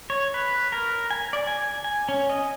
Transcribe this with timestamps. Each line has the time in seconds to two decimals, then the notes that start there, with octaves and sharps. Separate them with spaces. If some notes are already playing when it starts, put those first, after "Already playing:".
0.10 C#5
0.34 B4
0.72 A#4
1.11 G#5
1.33 D5
1.47 G#5
1.84 G#5
2.09 C#4
2.30 D#5